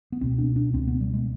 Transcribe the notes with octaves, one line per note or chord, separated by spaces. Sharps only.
B3
C#2 B2 C4
D4
D4
C#2 B2 C4
B3
G3
G#3